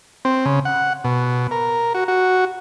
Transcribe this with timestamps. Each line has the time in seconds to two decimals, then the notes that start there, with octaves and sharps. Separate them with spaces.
0.25 C4
0.45 C#3
0.65 F#5
1.04 B2
1.51 A#4
1.94 F#4
2.08 F#4